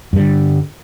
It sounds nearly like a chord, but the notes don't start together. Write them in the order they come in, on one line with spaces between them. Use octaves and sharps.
G2 G3 D3